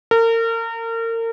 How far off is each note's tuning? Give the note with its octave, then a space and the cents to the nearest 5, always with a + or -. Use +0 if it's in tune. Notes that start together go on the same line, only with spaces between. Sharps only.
A#4 -35